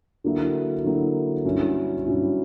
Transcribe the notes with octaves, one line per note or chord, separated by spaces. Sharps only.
D3 F#3 A#3 E4
D3 F#3 A#3 E4
G2 F#3 C#4 E4
G2 F#3 C#4 E4